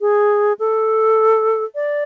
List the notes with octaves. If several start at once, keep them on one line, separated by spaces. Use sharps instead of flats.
G#4
A4
D5